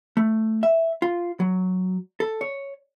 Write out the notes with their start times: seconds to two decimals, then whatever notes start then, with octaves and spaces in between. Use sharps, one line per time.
0.17 A3
0.63 E5
1.02 F4
1.40 F#3
2.20 A4
2.41 C#5